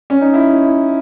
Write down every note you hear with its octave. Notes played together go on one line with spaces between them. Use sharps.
C#4
D#4
E4